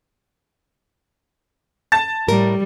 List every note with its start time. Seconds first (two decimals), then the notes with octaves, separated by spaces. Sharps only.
1.92 A5 A6
2.28 A2 G3 A#4